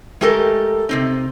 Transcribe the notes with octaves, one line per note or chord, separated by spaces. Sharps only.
G#3 A3 G4 A4 A#4
C3 C4 D#4